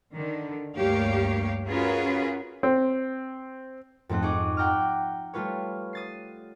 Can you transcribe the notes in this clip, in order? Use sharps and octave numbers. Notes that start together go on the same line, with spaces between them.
D3 D#3
D2 G2 A#3 G4 C#5 F5
C#4 F4 F#4 G#4 A#4 B4
C4
F2 G#2 A3 C4 F#6
D#4 G#4 D#5 C#6 D6
F#5 G5 A#5 D6 F6
G3 A3 F4 B4 C#5
D#6 A6 C7